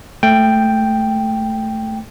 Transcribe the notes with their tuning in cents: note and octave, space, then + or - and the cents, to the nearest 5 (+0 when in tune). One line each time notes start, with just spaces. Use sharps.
A3 -5 G5 +0